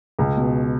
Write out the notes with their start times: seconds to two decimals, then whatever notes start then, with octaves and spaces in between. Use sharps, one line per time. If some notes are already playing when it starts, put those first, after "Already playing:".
0.19 C#2
0.37 B2